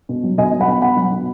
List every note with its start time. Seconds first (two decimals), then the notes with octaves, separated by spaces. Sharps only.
0.09 B2
0.23 F#3
0.38 B2 D#5 G#5
0.53 F#3
0.61 F#5 B5
0.68 B3
0.82 B2 F#5 B5
0.97 F#3
1.12 B2